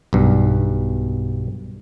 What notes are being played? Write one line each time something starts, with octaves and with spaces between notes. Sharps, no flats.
B1 G2